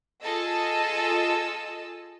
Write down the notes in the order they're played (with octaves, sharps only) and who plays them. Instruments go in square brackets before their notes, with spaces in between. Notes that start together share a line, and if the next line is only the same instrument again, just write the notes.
[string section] F4 G#4 A4 D#5 A5 E6